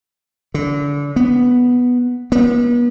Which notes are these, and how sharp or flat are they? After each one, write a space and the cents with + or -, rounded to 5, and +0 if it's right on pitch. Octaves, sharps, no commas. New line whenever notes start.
D3 -30
B3 +0
B3 -40